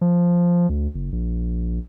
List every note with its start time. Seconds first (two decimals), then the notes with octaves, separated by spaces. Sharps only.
0.01 F3
0.69 D2
0.94 F#1
1.12 A#1